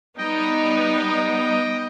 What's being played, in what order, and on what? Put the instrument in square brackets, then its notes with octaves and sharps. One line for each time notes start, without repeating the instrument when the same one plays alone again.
[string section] G3 B3 D#4 [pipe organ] D#5 G5